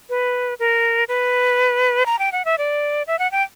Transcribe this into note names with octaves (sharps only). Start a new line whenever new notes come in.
B4
A#4
B4
A#5
G5
F#5
E5
D5
E5
F#5
G5